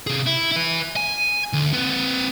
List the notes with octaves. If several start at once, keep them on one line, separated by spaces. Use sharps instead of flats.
C3 G#4
E4
E4 B4
G#5
D2
C4 B4